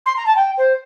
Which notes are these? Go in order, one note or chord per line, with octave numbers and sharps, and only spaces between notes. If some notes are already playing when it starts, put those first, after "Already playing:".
C6
A#5
A5
G5
C5